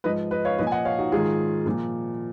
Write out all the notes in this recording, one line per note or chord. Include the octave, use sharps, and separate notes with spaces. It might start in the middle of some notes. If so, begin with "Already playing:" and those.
G#2 F3 B4 D#5
B4 D#5
C#5 F5
A#2 F3 B4 D#5
G#5
D#5 F#5
C#5 F5
D#4 F#4
G#2 D#3 F4 G#4
A#2 F3